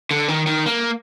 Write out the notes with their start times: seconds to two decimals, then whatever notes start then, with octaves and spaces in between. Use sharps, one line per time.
0.11 D3
0.28 D#3
0.47 D#3
0.66 A#3